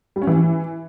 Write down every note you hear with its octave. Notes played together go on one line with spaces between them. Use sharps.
G3
C#4
E3